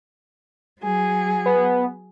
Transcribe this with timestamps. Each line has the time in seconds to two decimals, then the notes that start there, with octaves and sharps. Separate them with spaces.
0.81 F#3 G#4
1.46 B3